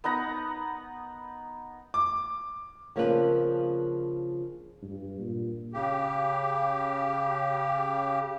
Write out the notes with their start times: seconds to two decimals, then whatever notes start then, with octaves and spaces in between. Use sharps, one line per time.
0.04 B3 D#4 F#5 A#5
1.94 D6
2.96 C#3 F3 A#3 C4 D4 B4
4.82 G2
5.19 A#2
5.73 C#3 G4